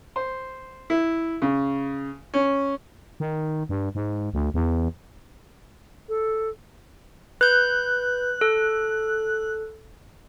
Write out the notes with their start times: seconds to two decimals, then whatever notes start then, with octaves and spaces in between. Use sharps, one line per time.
0.16 C5
0.90 E4
1.42 C#3
2.34 C#4
3.20 D#3
3.69 G2
3.95 G#2
4.34 D2
4.54 E2
6.09 A4
7.41 B4 F#6 G6
8.41 A4